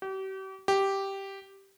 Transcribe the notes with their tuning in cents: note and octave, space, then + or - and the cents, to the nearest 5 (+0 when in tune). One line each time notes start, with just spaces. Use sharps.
G4 -40
G4 -5